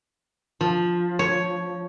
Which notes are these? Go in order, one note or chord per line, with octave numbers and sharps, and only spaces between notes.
F3
C#5